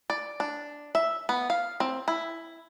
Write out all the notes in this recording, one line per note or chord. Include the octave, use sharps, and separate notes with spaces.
D5
D4
E5
B3
F5
C4
E4